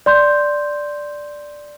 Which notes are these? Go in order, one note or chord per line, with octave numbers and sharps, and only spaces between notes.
D5 C6 G6